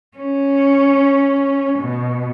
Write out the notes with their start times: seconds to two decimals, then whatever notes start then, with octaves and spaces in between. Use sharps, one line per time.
0.17 C#4
1.79 B2